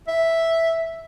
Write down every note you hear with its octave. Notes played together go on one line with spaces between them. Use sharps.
E5